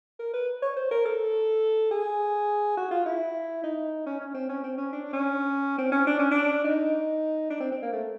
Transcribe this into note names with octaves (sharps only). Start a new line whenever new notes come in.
A#4
B4
C#5
C5
A#4
A4
G#4
F#4
F4
E4
D#4
C#4
C#4
C4
C#4
C4
C#4
D4
C#4
C4
C#4
D4
C#4
D4
D#4
D4
C4
C4
A#3
A3